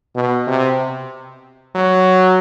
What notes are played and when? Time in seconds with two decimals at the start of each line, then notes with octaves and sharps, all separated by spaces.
0.15 B2
0.47 C3
1.75 F#3